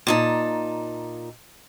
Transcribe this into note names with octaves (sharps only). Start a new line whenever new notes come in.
A#2 D#4 A5